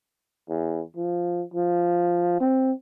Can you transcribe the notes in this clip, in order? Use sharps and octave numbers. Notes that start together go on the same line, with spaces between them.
E2
F3
F3
C4